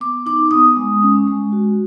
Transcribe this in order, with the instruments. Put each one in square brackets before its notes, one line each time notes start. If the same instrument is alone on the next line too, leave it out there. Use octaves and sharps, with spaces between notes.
[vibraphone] B3 D6
D#4 D6
B3 D#6
G#3
C#4
G#3
F#4